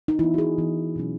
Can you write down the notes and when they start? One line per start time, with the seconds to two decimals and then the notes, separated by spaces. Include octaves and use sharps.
0.08 D#4
0.19 E3 B3 E4
0.34 F#4
0.38 G#4
0.58 E3 B3
0.96 B2 F#3 C#4